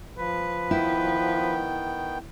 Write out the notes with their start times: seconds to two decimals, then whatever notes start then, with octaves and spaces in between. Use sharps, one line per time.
0.18 F3 B4
0.71 D#3 B3 E4 G5